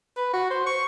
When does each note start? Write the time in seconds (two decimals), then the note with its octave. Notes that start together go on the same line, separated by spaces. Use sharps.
0.17 B4
0.33 F#4
0.51 C5
0.66 C#6